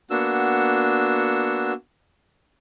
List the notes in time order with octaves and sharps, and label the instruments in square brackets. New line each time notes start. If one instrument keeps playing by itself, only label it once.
[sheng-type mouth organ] A#3 B3 D4 F#4 E6